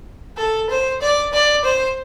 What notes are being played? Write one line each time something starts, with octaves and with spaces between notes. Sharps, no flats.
A4
C5
D5
D5
C5